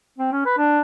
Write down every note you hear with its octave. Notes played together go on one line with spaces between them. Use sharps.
C4
C#4
B4
D4